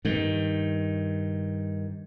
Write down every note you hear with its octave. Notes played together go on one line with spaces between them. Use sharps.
G2 D#3